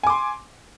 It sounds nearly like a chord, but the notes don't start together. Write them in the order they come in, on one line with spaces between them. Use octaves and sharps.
G#5 D6 C6